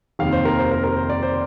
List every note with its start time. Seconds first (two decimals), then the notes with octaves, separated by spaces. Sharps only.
0.19 F1 D#2 D#3 F5
0.32 C5
0.45 A#4
0.59 C5
0.71 A#4
0.84 A#4
0.97 C5
1.10 D5
1.23 C5